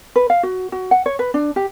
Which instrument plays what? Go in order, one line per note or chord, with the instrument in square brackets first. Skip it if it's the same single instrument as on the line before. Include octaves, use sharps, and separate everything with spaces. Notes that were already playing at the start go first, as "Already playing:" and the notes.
[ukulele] B4
F5
F#4
F#4
F#5
C#5
B4
D4
G4